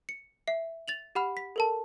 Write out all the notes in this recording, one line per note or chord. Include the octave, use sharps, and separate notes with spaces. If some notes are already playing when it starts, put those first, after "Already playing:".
C#7
E5 C7
A6 F7 F#7
G4 F#5 B5 F6
B6
A4 A#4 A5